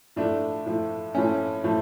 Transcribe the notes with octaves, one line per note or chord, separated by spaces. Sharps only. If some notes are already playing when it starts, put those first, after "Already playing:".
A2 F3 A3 D4
A2 F3 A3
A2 F3 A3 C#4
A2 F3 A3